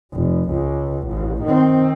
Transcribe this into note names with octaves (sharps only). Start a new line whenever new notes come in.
F1
C#2
A1
D#3 C4